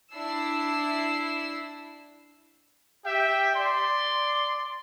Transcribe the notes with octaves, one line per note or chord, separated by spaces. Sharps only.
D4 E4 E6 C7
G4 E5 G5
D5 C6